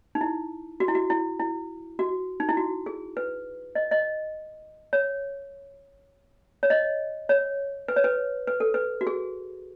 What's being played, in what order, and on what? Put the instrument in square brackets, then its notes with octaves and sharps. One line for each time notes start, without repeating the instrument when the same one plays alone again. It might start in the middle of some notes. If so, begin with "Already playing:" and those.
[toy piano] D#4
E4
F#4
E4
F#4
E4
E4
F#4
D#4
E4
F#4
G#4
B4
D#5
D#5
C#5
C#5
D#5
C#5
B4
C#5
B4
B4
A4
B4
F#4
G#4